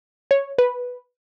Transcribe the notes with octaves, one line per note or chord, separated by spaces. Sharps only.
C#5
B4